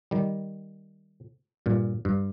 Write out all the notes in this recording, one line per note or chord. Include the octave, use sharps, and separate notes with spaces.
D#3 G3
G2 A#2
G2